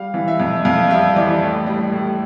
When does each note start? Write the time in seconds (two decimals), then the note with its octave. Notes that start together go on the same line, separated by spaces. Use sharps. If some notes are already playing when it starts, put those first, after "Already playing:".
Already playing: G3 F5
0.14 E3
0.28 E5
0.40 F2
0.65 F2 F5
0.90 G3 E5
1.16 E3 D5
1.42 A2
1.67 G3
1.92 A2